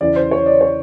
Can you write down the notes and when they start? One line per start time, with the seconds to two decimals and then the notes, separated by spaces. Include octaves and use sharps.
0.01 E2 C#3 E3 D5
0.16 C5
0.31 C#5
0.46 D5
0.61 C#5